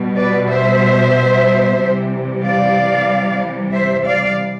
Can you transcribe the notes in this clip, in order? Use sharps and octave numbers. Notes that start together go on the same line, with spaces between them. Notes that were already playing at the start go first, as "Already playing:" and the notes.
Already playing: B2 G3
B4 D5
C5 E5
C3 E3 G3
D5 F5
C5 E5
D5 F5